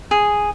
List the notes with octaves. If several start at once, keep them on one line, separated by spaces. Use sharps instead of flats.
G#4